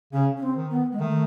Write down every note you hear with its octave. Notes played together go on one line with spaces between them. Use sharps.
C#3 C#4
C#4
C4
D#3
B3
G#3
D#3 A3